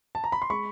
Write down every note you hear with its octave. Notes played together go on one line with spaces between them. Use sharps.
A5
A#5
B5
C6
G#3 B5 C#6